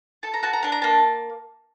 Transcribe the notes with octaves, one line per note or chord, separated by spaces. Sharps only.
A4 A5
A#5
F#4 A5
A#5
D4 A5
A#5
A#3 A5